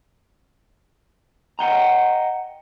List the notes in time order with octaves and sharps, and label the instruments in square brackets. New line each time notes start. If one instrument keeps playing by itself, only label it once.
[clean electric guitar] D#5 F#5 G5 A#5